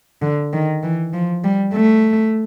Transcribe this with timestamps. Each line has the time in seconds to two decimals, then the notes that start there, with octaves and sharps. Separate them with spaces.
0.22 D3
0.53 D#3
0.83 E3
1.14 F3
1.44 G3
1.74 A3